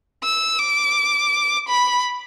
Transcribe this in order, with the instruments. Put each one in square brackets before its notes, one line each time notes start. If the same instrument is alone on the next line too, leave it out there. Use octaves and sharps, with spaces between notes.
[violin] E6
D6
B5